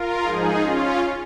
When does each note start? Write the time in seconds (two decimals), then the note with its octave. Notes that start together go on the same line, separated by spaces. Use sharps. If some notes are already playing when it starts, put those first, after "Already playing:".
Already playing: F4 A#4
0.22 G#2 F3 D#4 G#4
0.59 C#4 F4